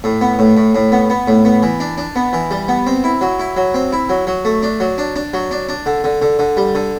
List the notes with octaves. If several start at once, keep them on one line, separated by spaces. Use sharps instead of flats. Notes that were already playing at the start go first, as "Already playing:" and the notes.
A2
B3
A2
A2
A2
B3
B3
A2
B3
E3
D4
D4
B3
E3
G3
B3
C4
E4
F#3
E4
F#3
C4
E4
F#3
F#3
A3
D4
F#3
D4
D4
F#3
D4
D4
D3
D3
D3
D3
G3
D3